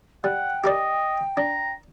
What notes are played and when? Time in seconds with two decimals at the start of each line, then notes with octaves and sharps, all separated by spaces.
0.24 G3 F#5 G5
0.64 G4 A#4 D5 D#5
1.37 D4 A#5